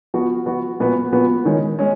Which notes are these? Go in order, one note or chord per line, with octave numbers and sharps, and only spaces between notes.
F3 B3 F#4
F3 B3 F#4
A#2 F3 B3 F#4 B4
A#2 F3 B3 F#4 B4
D#3 G#3 C#4
G#3 C#4